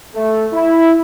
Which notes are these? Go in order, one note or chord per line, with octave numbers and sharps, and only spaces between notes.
A3
E4